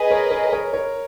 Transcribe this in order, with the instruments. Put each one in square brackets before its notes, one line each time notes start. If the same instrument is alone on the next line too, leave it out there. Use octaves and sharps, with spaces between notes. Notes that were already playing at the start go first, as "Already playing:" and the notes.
Already playing: [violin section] G#4 B4 D#5
[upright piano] A#4 C#5
A#4 C#5
A#4 C#5
A#4 C#5